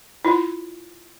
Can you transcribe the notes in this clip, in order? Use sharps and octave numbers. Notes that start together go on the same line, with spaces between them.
E4 F4